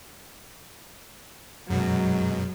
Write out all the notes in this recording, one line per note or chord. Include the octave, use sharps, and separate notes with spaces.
F#2 B2 F#3 G#3